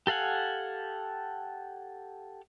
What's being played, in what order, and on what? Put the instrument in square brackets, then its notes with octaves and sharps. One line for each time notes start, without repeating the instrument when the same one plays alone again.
[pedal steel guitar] G4 A4 F5 F#5 G#5